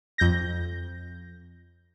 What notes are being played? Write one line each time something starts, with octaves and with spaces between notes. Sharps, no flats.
F2 G6 A#6